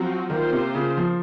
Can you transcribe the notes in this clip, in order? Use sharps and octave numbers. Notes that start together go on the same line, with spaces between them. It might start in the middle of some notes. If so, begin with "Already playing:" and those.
Already playing: F3 F#3 C4 F#4
D#3 A#3 F4 C5
C3
C#3
F3